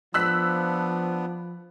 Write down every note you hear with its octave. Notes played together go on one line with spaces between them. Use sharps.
F3 B3 D4 E6 F#6 B6